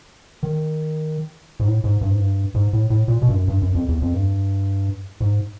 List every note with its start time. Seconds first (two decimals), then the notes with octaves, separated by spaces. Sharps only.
0.43 D#3
1.60 G#2
1.66 A2
1.84 G#2
2.01 G2
2.10 G#2
2.19 G2
2.55 G#2
2.73 A2
2.90 A2
3.08 A#2
3.22 B2
3.28 G2
3.35 F#2
3.48 G2
3.62 F#2
3.75 F2
3.88 E2
4.02 F2
4.14 G2
5.20 G#2